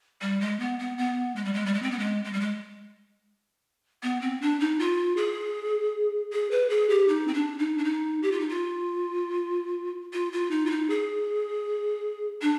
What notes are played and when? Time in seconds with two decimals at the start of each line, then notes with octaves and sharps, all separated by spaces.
0.21 G3
0.41 G#3
0.60 B3
0.79 B3
0.98 B3
1.36 G#3
1.45 G3
1.54 G#3
1.66 G3
1.74 G#3
1.82 C4
1.91 B3
1.99 G#3
2.25 G#3
2.33 G3
2.40 G#3
4.03 B3
4.21 C4
4.42 D4
4.60 D#4
4.79 F4
5.17 G#4
6.32 G#4
6.51 B4
6.70 G#4
6.90 G4
7.08 D#4
7.28 C4
7.34 D4
7.59 D#4
7.78 D4
7.85 D#4
8.23 G4
8.32 F4
8.40 D#4
8.49 F4
10.13 F4
10.33 F4
10.51 D#4
10.66 F4
10.71 D#4
10.90 G#4
12.42 D4